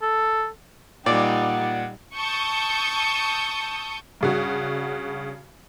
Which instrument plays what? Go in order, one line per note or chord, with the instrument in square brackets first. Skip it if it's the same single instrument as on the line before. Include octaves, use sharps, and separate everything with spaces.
[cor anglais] A4
[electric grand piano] A#2 [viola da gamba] G3 D#4 [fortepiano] D5 [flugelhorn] F#5
[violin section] A5 C#6 D#6 E6 G6
[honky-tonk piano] G2 C#3 F#4